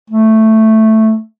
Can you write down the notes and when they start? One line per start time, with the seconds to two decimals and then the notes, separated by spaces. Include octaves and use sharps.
0.10 A3